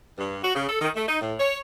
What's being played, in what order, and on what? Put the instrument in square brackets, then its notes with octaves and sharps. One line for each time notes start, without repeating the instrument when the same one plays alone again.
[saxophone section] G2
F#4
C#3
A4
D#3
A3
D#4
A2
C#5